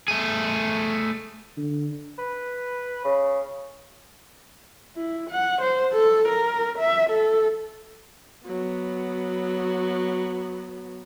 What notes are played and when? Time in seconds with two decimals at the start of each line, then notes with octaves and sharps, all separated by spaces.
0.08 A3 G#4
1.57 D3
2.18 B4
3.04 C#3
4.96 E4
5.30 F#5
5.61 C5
5.93 A4
6.28 A#4
6.79 E5
7.10 A4
8.46 F#3 B3